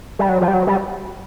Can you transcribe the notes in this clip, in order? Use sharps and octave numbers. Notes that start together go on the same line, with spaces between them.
G3
F#3
F3
G3
F#3
G3